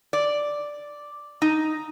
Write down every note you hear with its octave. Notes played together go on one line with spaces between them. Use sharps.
D5
D#4